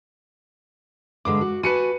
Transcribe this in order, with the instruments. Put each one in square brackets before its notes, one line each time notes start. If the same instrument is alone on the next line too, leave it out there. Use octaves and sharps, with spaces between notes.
[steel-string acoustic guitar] G2 D3 G#3 [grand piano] D6
[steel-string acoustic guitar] F#4
[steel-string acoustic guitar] F#4 G#5 A5 [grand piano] B4 C#7 D#7